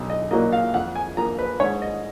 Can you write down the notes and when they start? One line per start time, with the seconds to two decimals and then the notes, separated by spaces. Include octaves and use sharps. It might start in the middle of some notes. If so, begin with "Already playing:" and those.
Already playing: B1
0.10 D#5
0.31 A#2 F#3 A#3 D#5
0.52 F5
0.74 F2 F#5
0.95 G#5
1.17 F3 A#3 A#5
1.39 B4
1.60 G#2 C#5
1.82 D#5